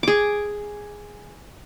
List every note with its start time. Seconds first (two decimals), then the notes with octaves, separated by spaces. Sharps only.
0.03 G#4 D6